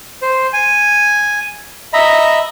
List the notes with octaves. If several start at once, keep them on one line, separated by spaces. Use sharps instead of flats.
C5
G#5
D#5 E5 A#5 B5